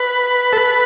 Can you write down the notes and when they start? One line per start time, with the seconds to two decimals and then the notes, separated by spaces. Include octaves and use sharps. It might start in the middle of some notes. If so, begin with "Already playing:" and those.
Already playing: B4
0.53 A4
0.57 B4